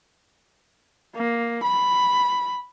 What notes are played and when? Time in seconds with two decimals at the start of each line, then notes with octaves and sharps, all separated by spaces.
1.16 A#3
1.64 B5